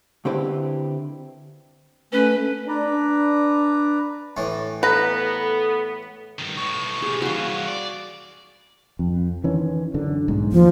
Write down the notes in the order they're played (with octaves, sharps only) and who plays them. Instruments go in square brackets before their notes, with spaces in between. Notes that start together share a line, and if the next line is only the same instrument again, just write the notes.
[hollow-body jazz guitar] D3 C4 E4 G4 B4
[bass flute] A3 [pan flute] C#4 [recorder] B4
[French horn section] D4 [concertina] B4 D5 A#5
[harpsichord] A2 E3
[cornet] B3 [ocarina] A4 [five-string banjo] B4 A#5
[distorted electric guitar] G2 D#3
[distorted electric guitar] B1 A2 [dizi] C#6
[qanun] G4 G#4
[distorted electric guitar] C2 E3 [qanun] F#4 F5
[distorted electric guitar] D5
[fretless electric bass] F2
D#3 E3 C#4
F#2 D3
B1 G#2
[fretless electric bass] D#2 [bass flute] F3